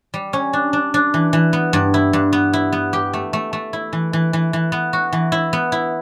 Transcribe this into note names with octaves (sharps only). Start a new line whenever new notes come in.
G3
C#4
D4
D4
D4
E3
E3
B3
G2
E4
G2
B3
E4
B3
G4
A3
A3
A3
E4
E3
E3
E3
E3
B3
F#4
E3
E4
B3
E4